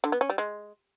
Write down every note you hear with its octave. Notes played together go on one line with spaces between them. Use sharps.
D3
B3
C#4
G3
G#3